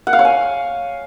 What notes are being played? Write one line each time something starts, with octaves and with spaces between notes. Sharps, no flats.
F#5
F5
C#5
G#5